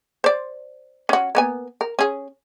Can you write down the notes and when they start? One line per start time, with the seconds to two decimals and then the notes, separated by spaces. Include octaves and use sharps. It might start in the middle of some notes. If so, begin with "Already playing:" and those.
0.24 C5 D5
1.09 C#4 F#4
1.35 A#3 B3 G#5
1.81 A#4
1.99 C#4 G#4